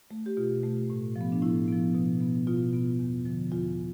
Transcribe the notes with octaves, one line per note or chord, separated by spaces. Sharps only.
A3
G4
B2 F4
A3
A2
F3
B3
D4
A2 E4
F3 B3
B2
B3
B2 F4
B3
E2
D3 F3
E2 F4